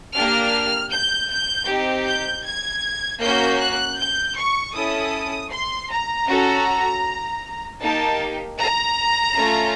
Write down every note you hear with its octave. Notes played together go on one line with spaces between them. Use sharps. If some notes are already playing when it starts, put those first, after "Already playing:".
A#3 D4 G4 F6
G6
G6
C4 D#4 G4
G6
G#6
A#3 C#4 F#4 G6
F#6
G6
C#6
C#4 E4 A4 D#6
C6
A#5
C#4 F#4 A4
A#3 D#4 G4 A5
A#5
A3 C#4 F4